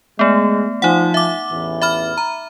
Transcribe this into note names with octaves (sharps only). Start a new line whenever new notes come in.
G#3 A3 B3
F3 D#4 F#5
E5 D6
A1 E2 E3
E5 B5 F6
A#5